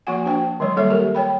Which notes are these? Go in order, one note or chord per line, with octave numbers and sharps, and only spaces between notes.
F3 A#3 F#4 F#5 G#5
D4 F#4 C5 G5
D#3 F#3 G#3 C#5
G3 A#3 A4 C#5 E5
G4 A4 A#4
C#5 G5 B5